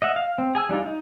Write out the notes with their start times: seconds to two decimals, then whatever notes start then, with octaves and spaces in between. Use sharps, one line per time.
0.02 D#5 E5 F#5
0.16 F5
0.38 C4
0.55 G#4 G#5 E6
0.69 G3 D4 D#4 F4
0.86 D#4